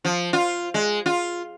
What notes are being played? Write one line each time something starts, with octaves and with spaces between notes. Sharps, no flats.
F3
F4
G#3
F4